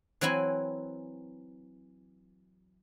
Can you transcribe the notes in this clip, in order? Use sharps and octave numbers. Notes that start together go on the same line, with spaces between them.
E3 F#3 C4 E4 G#5